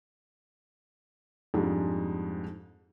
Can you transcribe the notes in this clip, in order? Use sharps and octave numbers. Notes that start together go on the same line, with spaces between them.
F2 G#2 G3 G#3 D4